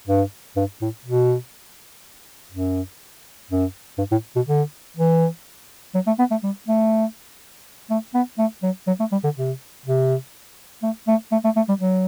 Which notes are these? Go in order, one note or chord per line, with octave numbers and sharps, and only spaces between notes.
G2
G2
A2
B2
F#2
F#2
G2
A2
B2
D3
E3
F#3
A3
B3
A3
G3
A3
A3
B3
A3
F#3
F#3
A3
G3
D3
C3
C3
A3
A3
A3
A3
A3
G3
F#3